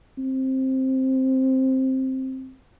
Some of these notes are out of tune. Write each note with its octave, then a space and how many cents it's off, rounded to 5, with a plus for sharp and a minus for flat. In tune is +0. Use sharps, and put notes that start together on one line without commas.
C4 +10